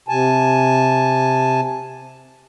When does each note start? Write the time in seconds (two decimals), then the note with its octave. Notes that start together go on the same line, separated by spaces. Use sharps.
0.08 C3 G#5 A5